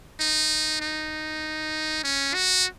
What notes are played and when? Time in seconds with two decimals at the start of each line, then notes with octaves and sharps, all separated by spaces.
0.20 D#4
0.81 D#4
2.04 C#4
2.34 F#4